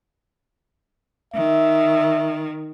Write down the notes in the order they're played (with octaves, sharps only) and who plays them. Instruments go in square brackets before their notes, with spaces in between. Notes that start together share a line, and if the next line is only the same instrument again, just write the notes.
[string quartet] D#3 [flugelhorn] E5